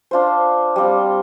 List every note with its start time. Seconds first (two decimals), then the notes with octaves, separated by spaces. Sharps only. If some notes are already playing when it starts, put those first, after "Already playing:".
0.11 D4 F4 C5
0.76 G3 C4 F4